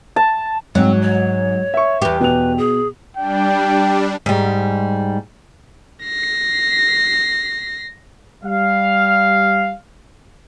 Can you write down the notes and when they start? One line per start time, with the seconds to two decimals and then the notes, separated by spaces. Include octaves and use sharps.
0.16 A5
0.75 G#2 F#3 C4
1.02 C#5
1.74 E5 C#6
2.02 E2 G4 B4
2.20 B2 B4 F7
2.58 G#4
3.17 G3 D4 G5
4.26 G#2 G3
6.04 A#6 C7
8.44 G3 F5